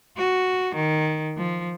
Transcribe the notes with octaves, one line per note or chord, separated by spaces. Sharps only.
F#4
D#3
F3